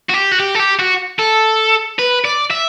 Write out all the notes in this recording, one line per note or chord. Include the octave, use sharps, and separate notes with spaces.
F#4
G4
F#4
G4
A4
G4
F#4
A4
B4
D5
E5